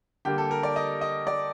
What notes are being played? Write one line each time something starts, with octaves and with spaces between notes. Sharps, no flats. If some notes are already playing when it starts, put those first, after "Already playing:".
D3 G3 A#3 G4
A4
A#4
D5
D#5
D#5
D5